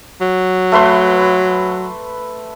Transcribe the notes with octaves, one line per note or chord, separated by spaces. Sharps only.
F#3
A3 B4 C6